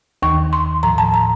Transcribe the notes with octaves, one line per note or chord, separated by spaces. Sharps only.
D#2 D#3 C#6
C6
A2 F3 A#5
A5
A#5